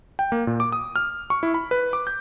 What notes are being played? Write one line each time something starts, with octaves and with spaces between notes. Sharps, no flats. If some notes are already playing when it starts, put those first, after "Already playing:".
G5
A#3
A#2
D6
D#6
F6
C#6
E4
B5
B4
D6
G6